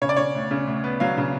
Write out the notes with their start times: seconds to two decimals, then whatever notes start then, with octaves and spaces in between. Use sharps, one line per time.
0.02 C#3 C#5
0.09 D5
0.17 C#3 C#5
0.35 D2
0.51 C#3
0.67 D2
0.84 B3
1.00 F#3 F5
1.17 C#3